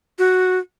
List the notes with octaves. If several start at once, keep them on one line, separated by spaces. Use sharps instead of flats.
F#4